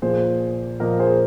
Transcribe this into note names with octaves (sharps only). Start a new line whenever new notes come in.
A#2 F3 A#3 G#4 C5
A#2 F3 A#3 A#4 D#5
G#4 C5